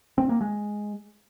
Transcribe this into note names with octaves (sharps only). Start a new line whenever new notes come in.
C4
A#3
G#3